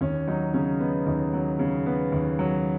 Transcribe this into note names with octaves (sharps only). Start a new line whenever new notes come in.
D#2 C#4
F#3 D#4
C#3 C#4
B3 D#4
D#2 D#4
F#3
C#3
B3
D#2
F#3